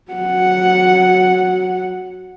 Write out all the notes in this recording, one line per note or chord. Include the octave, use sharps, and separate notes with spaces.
F#3 F#5